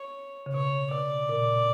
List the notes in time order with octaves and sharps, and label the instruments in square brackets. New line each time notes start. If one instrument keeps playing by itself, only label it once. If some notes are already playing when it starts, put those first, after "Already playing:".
Already playing: [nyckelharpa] C#5
[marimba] C#3
[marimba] B2 [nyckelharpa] C#5
[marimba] B2 [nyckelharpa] D5
[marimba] A#2